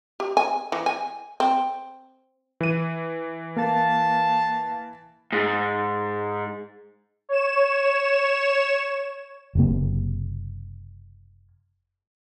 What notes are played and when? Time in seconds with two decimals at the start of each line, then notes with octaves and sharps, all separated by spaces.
0.20 G4
0.37 G#5
0.72 E3
0.86 G#5
1.40 C4
2.61 E3 D#7
3.57 A#3 F5 A5
5.32 G#2
7.29 C#5 E7
9.55 F#1 C3 A#3